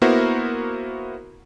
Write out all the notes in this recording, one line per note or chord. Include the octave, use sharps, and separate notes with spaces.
A#3 B3 E4 F#4 A#4 C5